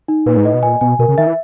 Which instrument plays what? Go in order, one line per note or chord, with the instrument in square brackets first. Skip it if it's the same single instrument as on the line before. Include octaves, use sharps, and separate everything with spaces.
[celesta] D#4
[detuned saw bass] A#2 [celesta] B4
[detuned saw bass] G#2
[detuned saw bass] A2 [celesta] D#5
[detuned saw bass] B2
[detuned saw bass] A#2 [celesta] G#5
[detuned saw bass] B2 [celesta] G#5
[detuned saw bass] B2 [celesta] A#4
[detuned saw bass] C#3
[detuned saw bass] D#3 [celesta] E5
[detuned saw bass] E3